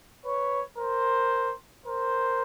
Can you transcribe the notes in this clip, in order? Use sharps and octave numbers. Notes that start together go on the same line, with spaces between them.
B4 C#5
A#4 C5
A#4 C5